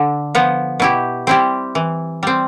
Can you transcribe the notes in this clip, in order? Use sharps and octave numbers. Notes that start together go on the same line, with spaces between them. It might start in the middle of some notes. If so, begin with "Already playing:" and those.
Already playing: D3
F3 B3
B2 E4 G4
G3 C4 E4 G4
E3
G3 C4